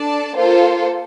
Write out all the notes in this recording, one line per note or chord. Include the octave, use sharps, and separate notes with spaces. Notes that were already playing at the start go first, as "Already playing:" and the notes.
Already playing: D4 A4 D5 A5
A#3 F4 A4 C5